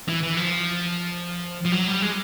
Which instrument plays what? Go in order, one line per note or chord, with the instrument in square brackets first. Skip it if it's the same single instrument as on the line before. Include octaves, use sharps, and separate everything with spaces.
[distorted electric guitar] E3
E3
F3
F3
F#3
G3
G#3